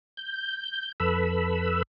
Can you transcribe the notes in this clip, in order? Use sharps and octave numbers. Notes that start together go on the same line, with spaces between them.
G6
F2 A4 B4 B5 E6